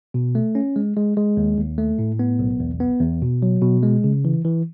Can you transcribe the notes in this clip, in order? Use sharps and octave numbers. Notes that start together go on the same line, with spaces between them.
B2
A3
C#4
G#3
G#3
G#3
D#2
D#2
A3
A2
B3
B1
E2
B3
E2
B2
F#3
B2
G#3
C#3
E3
E3